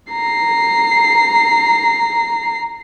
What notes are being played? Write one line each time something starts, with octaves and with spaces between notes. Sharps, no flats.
A#5 C7